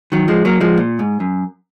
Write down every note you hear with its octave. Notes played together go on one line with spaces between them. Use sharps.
D#3 F#3
F3 G#3
F#3 A#3
F3 G#3
A#2
G#2
F#2